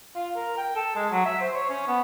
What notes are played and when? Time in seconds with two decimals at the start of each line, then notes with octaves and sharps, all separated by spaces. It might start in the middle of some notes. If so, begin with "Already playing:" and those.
0.15 F4
0.36 A#4
0.57 G5
0.76 A4
0.96 G#3
1.11 F#3
1.25 E5
1.40 C5
1.55 C#5
1.70 C#4
1.87 B3